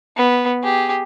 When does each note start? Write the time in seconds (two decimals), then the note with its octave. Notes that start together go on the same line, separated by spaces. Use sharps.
0.17 B3
0.64 G4 G#4